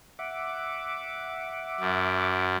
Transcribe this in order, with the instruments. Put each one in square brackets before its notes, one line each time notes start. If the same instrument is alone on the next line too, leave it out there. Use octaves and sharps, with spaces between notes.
[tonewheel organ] E5 F#5 D6
[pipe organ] F#2